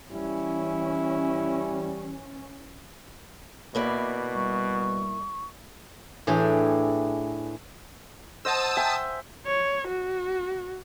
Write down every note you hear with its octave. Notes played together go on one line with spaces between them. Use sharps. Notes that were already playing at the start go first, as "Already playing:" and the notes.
E3 G3 C#4 E4
B2 A#3 E4 D5
G3 C#6
A2 E3 D4 E4 G4 G#4
C5 D#5 F#5 A5 D#6 E6
E5 G5 G#5
C#5
F#4